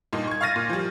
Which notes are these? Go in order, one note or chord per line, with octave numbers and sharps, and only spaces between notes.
G2 A#2 D#4
C#6 G#6
F5 C#6 F6 A6 A#6 D#7
A#2
F3 G3